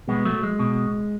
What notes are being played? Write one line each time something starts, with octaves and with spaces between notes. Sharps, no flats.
B2 G#3 B3
F#3 A3
G#3
B2